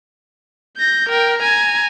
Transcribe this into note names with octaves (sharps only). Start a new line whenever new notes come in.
G6 A#6
A#4 G5
G#5 A#5